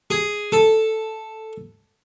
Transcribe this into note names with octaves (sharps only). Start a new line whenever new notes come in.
G#4
A4